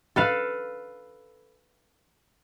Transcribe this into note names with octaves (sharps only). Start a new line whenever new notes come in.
A4 B4 F5